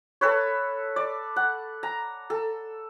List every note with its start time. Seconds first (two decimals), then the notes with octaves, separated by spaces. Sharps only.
0.21 A4 B4 C#5
0.96 D5
1.36 F#5
1.83 A#5
2.30 A4